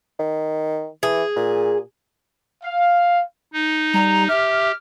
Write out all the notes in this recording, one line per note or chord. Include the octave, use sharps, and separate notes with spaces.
D#3
E3 G#4
A#2
F5
D#4
G3 A#5
G4 E5 F6